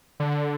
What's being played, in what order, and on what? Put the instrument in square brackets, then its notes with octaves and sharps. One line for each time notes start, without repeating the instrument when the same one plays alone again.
[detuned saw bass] D3